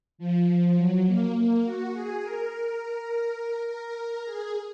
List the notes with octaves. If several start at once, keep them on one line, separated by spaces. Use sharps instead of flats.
F3
F#3
A#3
A#3
F#4
G#4
A#4
A#4
G#4